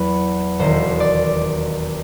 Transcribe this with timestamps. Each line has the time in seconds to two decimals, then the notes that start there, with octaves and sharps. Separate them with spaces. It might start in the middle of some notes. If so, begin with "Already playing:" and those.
Already playing: E2 F#3 B4
0.59 E1 D#2 D#3 C5
1.00 D5